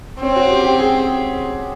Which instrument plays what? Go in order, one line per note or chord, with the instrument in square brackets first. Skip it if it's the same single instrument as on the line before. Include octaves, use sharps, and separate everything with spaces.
[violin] C4 [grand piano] C#4
[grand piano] F#4
G4
G4
G#4